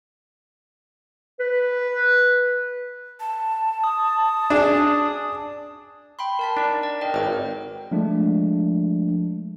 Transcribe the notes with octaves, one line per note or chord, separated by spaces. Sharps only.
B4
A5
D#6
D4 G#4
G5 B5 C6
A#4 A5 B6
D4 D#4 D5
D5
A#4 D#5 G5
G#1 B4 C#5 G5
F3 G#3 A3 D4